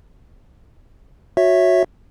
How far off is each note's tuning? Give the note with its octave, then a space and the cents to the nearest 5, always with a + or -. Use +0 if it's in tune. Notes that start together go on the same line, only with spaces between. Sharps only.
F#4 -20 C#5 +0 E5 +0